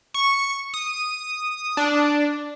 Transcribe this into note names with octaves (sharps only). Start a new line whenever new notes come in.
C#6
D#6
D4